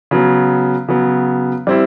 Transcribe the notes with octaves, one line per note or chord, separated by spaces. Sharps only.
C#3 F#3 B3
C#3 F#3 B3
G3 C4 E4